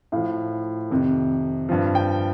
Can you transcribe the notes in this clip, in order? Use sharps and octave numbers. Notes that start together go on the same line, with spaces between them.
A2 F3 F5
F2 C3 D#3
G2 F3
G5